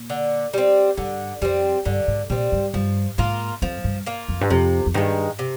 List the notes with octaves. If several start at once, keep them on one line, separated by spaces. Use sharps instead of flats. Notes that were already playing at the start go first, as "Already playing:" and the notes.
Already playing: A#2
D3
G3 C4
G2 D3
F2 G3 C4
G2 D3
G#2
A#2 G3 C4
G2
G2 F3
G#2 A#3 F4
F2 F3
G2
A#3 F4
F2
G2
F2 C3
F2
G2 D#3 G#3
C3